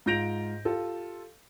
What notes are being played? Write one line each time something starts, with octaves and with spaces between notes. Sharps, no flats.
G#2 F4 G6 A#6 D7 F7
F4 G4 A4